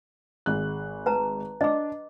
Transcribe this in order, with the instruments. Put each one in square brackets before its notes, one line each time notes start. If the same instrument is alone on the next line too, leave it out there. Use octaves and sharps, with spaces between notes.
[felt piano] G#1 G#3 F#6
[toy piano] B4 A5 A#5
[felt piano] D4 [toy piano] D#5 D6